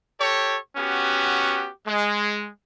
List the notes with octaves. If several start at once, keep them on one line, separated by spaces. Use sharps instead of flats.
G4 A4 C#5
B3 C#4 F#4 G4
G#3